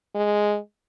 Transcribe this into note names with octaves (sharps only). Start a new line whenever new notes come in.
G#3